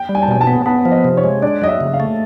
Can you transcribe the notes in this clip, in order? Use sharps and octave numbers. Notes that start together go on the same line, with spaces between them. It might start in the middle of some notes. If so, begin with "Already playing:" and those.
Already playing: G5
G3
G#5
A5
B2 G#5
A5
B3
B3 A5
F3
D#5
C3
C#5
G#3
D4 D5
F#3 D#5
E5
C#3
F5
A3